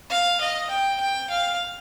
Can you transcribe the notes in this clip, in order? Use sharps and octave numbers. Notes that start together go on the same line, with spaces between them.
F5
D#5
G5
G5
F5